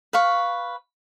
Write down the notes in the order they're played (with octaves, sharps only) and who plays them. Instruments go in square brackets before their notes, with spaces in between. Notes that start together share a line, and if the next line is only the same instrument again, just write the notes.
[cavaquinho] B4 F5 C#6